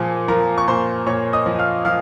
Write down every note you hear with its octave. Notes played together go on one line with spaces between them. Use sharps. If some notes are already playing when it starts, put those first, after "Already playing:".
Already playing: A#2 F3 G#4 G#5
F3 A#4 A#5
C#6
A#2 C5 C6
A#2 C#5 C#6
D#5 D#6
F3
F5 F6
F3 F5 F6